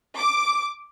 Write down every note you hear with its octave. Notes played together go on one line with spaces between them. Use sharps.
D6